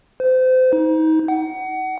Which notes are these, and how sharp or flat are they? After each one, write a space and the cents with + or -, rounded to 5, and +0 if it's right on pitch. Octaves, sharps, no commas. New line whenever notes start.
C5 -30
D#4 +30
F#5 +25